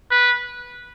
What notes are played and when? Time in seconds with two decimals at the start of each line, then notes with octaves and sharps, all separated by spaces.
0.11 B4